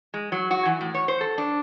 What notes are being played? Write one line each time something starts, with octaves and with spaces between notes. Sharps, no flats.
G#3
F#3
F#4
E3
A2
C#5
C5
A4
D4